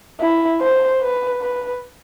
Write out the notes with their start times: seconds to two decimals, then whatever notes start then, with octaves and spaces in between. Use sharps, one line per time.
0.20 E4
0.61 C5
1.02 B4
1.42 B4